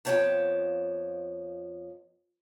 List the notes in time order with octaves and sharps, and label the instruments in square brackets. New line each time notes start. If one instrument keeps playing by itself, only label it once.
[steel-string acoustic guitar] F2 F3 B3 C#5 G5 A5